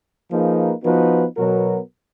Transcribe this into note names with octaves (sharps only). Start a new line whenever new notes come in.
F3 A#3 D#4 G#4 B4
F3 B3 D#4 F#4 B4
B2 F#3 B3 F#4 A#4